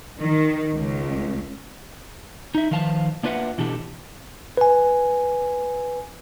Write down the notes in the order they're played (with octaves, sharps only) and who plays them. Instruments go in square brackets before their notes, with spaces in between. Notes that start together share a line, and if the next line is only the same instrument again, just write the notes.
[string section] D#3
C#2
[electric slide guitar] D#4 E5
D#3 F3 B4 F5 A5
A#3 D4 F4 B4 E5 F#5
B2 E3 D4 G4 A4
[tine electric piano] B4 G#5